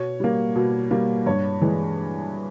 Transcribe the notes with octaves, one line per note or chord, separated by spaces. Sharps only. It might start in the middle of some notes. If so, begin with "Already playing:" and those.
Already playing: B2 C#5
G3 A#3
B2
G3 A#3
G2 C#5
E3 G#3